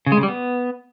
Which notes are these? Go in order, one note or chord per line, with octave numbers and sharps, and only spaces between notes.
C#3
G#3
C#3
G3
B3